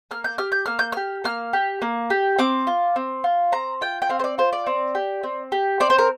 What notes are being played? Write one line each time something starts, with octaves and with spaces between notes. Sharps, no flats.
A#3 F6
G6
G4 F6
G6
A#3 F6
G6
G4 F6
A#3 F6
G4
A#3
G4
C4 D6
F4
C4
F4
C4 A#5
F4 G5
G5
C4 F5
C5
D5
F4 C5
D5
C4
G4
C4
G4
C4 D5
C5
A#4